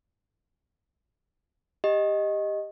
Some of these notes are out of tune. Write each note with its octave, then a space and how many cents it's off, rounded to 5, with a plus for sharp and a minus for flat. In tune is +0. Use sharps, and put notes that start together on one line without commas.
G4 +15 D#5 +0